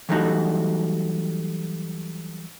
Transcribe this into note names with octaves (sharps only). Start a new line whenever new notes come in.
E3 F#3 G3 A3 D#4 F#4